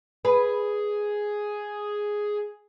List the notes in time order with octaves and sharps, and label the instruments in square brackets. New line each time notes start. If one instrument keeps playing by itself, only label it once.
[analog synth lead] G#4 [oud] B4